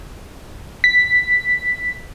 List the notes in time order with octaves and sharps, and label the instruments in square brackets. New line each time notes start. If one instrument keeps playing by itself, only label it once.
[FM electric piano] B6